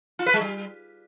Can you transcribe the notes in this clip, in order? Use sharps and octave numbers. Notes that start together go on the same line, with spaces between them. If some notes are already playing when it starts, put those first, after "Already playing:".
F4
B4
G#3
G3